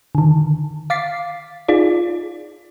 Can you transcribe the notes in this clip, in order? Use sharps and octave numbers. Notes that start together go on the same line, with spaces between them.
D3 D#3
F5 D6 A6 B6 C7
D#4 F4 G#4 D5